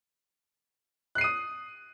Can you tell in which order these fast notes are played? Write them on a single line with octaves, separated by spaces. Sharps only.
F#6 C7 D#7 D#6